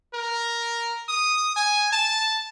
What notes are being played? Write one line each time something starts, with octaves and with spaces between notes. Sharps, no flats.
A#4
D#6
G#5
A5